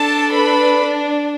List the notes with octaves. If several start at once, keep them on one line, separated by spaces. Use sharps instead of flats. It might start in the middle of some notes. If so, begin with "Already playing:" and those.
Already playing: D4 A4 A5
B4 B5